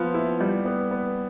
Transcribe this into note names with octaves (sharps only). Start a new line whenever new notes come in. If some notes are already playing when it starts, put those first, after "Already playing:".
Already playing: F3 B3 B4
E4
G3
B3
B3